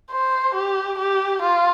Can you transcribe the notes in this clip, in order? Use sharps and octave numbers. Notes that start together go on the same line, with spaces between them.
C5
G4
G4
F4